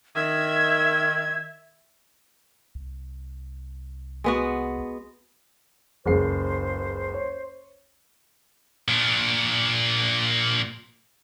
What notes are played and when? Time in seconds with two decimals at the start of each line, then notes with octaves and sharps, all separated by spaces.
0.16 D#3 E5 G#6
2.75 C2
4.24 G#3 B3 F#4
6.06 F#1 C#2 C5 C7
7.14 C#5
8.88 A#2 D4